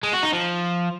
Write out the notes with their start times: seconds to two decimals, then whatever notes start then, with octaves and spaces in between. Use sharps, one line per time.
0.03 G#3
0.13 F#4
0.23 D#4
0.33 F3